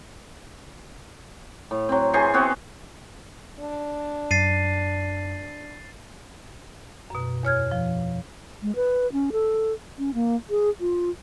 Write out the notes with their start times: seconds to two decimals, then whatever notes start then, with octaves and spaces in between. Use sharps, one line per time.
1.71 A2
1.89 F#3 C4
2.13 E3 G#4 C5 C#6
2.34 B3 C4 F#4
3.60 D4
4.31 F#2 A6 C7 D#7
7.10 F#2 B2
7.43 E2 C#5 F6 G#6
7.71 F3
8.62 G#3
8.76 B4
9.13 C#4
9.32 A4
9.98 C#4
10.14 A#3
10.50 G#4
10.80 F4